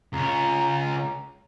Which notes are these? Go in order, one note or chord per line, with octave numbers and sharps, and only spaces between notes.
C#2 C#4 A#5